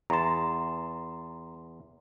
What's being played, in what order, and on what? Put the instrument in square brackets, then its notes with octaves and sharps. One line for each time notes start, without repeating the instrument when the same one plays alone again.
[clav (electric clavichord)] E2 A5 [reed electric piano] A#5 C6